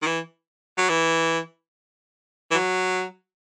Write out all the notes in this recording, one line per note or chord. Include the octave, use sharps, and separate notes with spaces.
D#3
E3
F#3
E3
E3
F#3